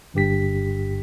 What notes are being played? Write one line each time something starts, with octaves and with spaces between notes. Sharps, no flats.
G1 G2 G4 B6